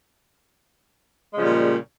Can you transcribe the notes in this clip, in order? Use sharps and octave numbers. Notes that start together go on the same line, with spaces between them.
A#2 C#3 F3 G3 G#3